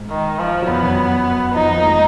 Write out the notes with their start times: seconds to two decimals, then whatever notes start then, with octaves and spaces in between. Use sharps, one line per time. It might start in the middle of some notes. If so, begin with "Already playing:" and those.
Already playing: G#2
0.11 D#3
0.40 F3
0.62 F#3
0.68 F2 F3 B3
0.83 F#2 F#3
1.54 F2 F3 D#4
1.69 F2 F3
1.78 A#3
1.84 G#3